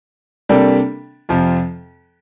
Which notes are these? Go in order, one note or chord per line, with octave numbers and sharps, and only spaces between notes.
C3 G3 A#3 D4 A4
F2 C3 F3